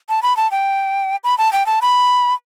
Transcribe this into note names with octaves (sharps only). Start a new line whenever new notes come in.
A5
B5
A5
G5
B5
A5
G5
A5
B5